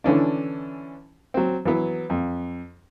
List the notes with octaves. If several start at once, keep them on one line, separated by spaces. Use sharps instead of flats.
D3 E3 C#4 D4
F#3 C4
E3 F#3 B3
F2